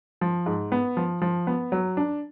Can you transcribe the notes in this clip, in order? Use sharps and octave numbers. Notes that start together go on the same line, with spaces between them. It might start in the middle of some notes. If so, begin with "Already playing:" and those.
F3
G#2
B3
F3
F3
B3
F#3
D4